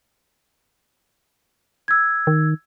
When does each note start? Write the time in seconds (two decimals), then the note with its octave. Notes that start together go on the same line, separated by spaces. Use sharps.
1.88 E6 G#6
2.27 D#3